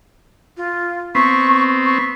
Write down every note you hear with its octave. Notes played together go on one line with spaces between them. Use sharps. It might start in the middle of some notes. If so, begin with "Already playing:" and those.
F4
B3 C4 C#6
C#6